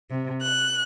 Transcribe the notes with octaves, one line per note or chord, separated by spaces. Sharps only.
C3
F#6